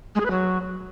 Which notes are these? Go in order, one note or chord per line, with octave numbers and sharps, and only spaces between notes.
G#3
G#4
B4
F#3